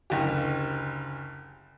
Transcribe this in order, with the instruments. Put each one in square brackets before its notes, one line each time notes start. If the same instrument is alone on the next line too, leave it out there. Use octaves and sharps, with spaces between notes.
[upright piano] F#1 D2 G4